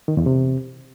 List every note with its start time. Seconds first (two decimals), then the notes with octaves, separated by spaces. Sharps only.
0.08 D#3
0.17 E2
0.26 C3